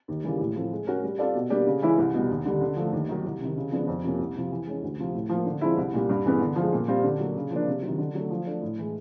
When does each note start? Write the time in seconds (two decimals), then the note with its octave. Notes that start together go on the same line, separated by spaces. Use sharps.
0.08 D#2
0.24 C#3 E3 G3 A#3
0.40 A2
0.56 F3 A3 C4
0.72 G#3
0.87 C#4 F#4 A#4
1.03 G3
1.19 C4 F4 A4 D5
1.35 B2
1.50 G3 A#3 D4 G4
1.67 C#3
1.82 E3 G#3 C#4 E4
1.98 C2
2.14 B2 G3
2.30 D#2
2.45 D3 G3
2.61 D3
2.76 F3 A3
2.92 D#2
3.09 D#3 F#3
3.25 C2
3.40 C3 D#3
3.56 C#3
3.72 F3 G#3 B3 D4
3.87 F2
4.03 C3 F3 A#3 C#4
4.19 C2
4.36 C3 F3
4.51 E3
4.67 G#3 C#4
4.82 D2
4.98 C3 F3
5.13 A2
5.29 F3
5.34 A#3
5.46 D3
5.61 F3 G#3 C4 E4
5.77 C2
5.93 A#2 G3
6.09 G2
6.25 E3 G#3 B3
6.41 D3
6.56 F3
6.61 G#3
6.72 A#2
6.88 G3 C4 F4
7.04 D3
7.20 F#3 A#3
7.36 C#3
7.51 F3 A#3 D4
7.67 C3
7.83 D#3 F#3
7.98 D3
8.15 F#3 A3
8.30 F3
8.46 A3 D4
8.62 A2
8.78 E3 G#3